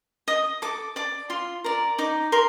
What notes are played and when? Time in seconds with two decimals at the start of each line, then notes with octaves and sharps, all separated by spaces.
0.28 D#5 D#6
0.62 A4 D6
0.96 D5 D6
1.30 F4 C6
1.64 A#4 D5
1.98 D#4 D6
2.32 A#4 C6